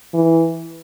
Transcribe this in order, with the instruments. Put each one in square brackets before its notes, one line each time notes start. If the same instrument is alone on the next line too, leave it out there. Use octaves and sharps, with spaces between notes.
[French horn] E3